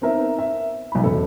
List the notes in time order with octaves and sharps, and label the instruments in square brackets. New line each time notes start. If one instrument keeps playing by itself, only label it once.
[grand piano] B3 C4 D#4 A#4 E5
E5
B1 B5
E1 A4